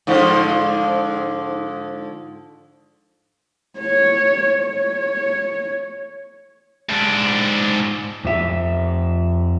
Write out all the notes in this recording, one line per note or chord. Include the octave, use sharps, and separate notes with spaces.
G#2 D3 F3
C#5
C#5
G#2 D4
F2 E5